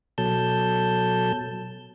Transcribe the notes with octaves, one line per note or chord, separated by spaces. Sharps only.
B2 F#3 A4 A5 G6